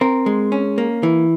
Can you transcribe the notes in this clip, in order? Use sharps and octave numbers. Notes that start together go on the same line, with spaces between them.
C4 A#4
G#3
C#4
A#3
E3